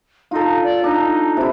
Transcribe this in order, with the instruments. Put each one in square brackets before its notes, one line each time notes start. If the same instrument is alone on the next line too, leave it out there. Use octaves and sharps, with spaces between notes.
[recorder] D#4 [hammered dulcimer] F4 A4
[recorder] D5
[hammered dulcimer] D4 [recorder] D#4
[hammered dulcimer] C3 E4